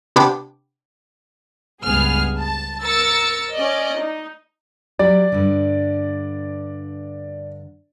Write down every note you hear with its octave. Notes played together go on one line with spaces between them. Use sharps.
C3 B3 D4 G5 D6
C#2 G2 B3 G#4 F6
A5
A#4 E6 A6 C#7
C#4 D5 D#5
D#4
F#3 G4 D5
G2 D3